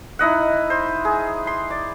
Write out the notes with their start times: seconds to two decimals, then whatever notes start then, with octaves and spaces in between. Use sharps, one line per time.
0.19 D#4 E4 D#5 F#5
0.70 C5
1.05 G#4
1.47 C6
1.70 D5